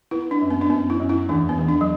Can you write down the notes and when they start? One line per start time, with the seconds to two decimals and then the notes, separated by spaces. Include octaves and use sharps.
0.11 B3 E4
0.31 D4
0.41 F#2
0.50 B3
0.61 D4
0.70 F#2 B3
0.90 E4
1.00 F#2
1.09 E4
1.29 E2 D4
1.49 B3
1.59 E2
1.69 D4
1.81 F#3